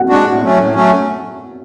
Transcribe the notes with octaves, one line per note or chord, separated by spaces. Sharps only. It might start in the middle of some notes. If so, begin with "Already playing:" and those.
Already playing: F#5
G#3 D4 F#4
A2
F#3 A3 C#4
A2
F#3 A3 C#4